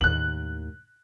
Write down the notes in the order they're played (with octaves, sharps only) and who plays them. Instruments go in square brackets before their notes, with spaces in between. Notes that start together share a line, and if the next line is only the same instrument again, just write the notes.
[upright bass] D#2 A2 [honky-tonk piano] F#6 F#7